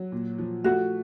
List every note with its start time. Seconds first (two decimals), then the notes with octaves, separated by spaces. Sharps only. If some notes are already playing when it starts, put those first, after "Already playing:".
Already playing: F#3
0.12 A#2
0.38 F3
0.64 A3 F#4